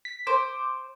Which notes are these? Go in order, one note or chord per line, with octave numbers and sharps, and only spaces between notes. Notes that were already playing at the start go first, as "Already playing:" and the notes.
B6
C5 D6